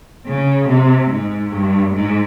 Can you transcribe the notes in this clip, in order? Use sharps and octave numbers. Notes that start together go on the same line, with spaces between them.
C#3
C3
G#2
G2
G#2